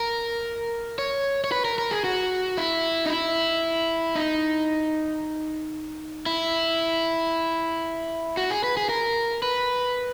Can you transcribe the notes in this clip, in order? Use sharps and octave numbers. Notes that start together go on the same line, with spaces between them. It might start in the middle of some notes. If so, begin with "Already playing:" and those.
Already playing: A#4
C#5
C#5
B4
A#4
A#4
G#4
F#4
E4
D#4
E4
D#4
E4
F#4
G#4
B4
G#4
A#4
B4